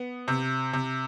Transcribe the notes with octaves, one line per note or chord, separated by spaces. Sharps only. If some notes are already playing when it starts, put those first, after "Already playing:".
Already playing: B3
C3
C3